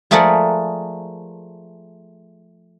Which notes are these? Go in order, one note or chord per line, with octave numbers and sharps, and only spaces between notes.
F3 A3 G#4 A#4 D5 F#5